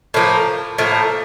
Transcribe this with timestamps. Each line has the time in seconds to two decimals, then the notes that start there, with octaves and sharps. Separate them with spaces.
0.14 A2 F3 A#3
0.78 A2 F3 A#3